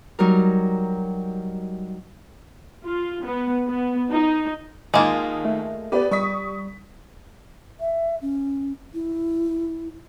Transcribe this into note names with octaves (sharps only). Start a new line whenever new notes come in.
F#3 G3 D#4 A#4
F4
B3
B3
D#4
D#2 D#3 G#3 A#3 F4 D#6
A3
B3 G4 B4 D5
G3 C#6 D#6 B6
E5
C#4
E4